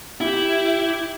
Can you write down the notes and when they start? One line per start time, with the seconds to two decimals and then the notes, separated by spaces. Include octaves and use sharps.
0.21 E4 G4